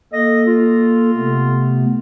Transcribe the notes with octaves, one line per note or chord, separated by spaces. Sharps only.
A#3 A4 D#5
F4
C3 A3 B3